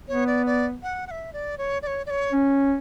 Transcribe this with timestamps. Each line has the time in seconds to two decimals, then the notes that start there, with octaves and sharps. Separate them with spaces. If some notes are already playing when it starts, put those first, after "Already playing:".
0.08 B3 C#5
0.27 D5
0.46 D5
0.83 F#5
1.07 F#5
1.11 E5
1.33 D5
1.58 C#5
1.82 D5
1.87 C#5
2.06 D5
2.10 C#5
2.32 C#4